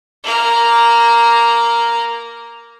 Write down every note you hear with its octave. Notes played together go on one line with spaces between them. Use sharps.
A#3 A#4